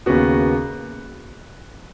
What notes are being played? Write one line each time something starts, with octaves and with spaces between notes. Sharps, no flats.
D#2 C#3 B3 F#4